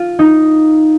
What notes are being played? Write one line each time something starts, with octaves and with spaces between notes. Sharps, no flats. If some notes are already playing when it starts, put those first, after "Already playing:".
Already playing: F4
D#4